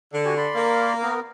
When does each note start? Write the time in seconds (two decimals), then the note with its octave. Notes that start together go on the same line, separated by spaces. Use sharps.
0.13 D3
0.25 F#4 G4 G#5
0.37 D5 B5 C6
0.55 A#3
1.02 B3 A#4